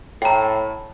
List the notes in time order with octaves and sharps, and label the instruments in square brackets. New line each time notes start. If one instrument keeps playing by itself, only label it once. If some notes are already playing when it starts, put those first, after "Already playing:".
[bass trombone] A2 [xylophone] G5 A#5